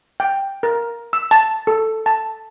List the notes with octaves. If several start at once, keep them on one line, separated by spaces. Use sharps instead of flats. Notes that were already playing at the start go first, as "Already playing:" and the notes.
G5
A#4
E6
A5
A4
A5